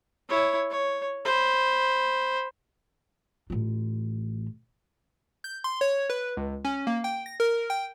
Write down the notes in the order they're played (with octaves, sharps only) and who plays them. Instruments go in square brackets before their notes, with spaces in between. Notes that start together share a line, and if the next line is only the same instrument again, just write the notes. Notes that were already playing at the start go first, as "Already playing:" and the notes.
[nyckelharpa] E4 C#5
C#5
C5 B5
[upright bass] A1 F4
[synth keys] G6
C6
C#5
B4
C#2
C#4
A#3
G5
A#6
A#4
G5